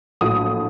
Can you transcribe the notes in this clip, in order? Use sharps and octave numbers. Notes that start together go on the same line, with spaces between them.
A#1 A2 F#3 D#6